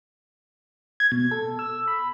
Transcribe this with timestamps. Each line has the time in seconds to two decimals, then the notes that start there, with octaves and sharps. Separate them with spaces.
1.00 G#6
1.12 B2
1.31 A4
1.59 E6
1.88 B5